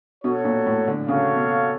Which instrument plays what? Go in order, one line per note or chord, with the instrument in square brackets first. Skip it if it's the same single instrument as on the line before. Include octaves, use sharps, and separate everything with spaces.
[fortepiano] B2 [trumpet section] F#4 A4 C#5
[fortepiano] A#2
A2
D3
[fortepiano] C#3 [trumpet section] F#4 A4 C#5 F5
[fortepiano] B2